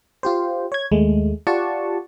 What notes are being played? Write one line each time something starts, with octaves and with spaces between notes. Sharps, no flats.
F4 G4 C5
C#5 G#6
D#2 G#3 A3
F4 G4 D5 F#5 A5 C#6